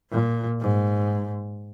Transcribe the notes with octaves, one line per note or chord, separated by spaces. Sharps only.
A#2
G#2